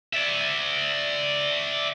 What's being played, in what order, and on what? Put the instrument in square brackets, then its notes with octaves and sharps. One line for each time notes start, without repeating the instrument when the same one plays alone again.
[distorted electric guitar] D5 E5